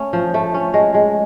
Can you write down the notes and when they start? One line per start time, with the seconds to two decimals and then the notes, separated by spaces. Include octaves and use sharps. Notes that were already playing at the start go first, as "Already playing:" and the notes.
Already playing: A3 C#4
0.13 F3
0.34 A3
0.54 C#4
0.74 G#3
0.94 G#3